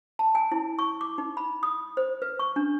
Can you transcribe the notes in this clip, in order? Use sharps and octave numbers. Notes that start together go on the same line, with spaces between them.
A5
G#5
E4
C#6
D6
D#4
B5
D#6
C5
B4
C#6
D4